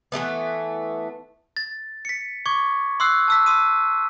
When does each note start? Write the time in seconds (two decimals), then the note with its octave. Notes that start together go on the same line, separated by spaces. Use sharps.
0.12 E3 G3 A3 B3
1.57 A6
2.05 B6 C#7
2.46 C#6 D6 G#6
3.00 C6 D#6 E6 F#6 C7
3.28 A5 E6 B6
3.46 C6 D#6 D#7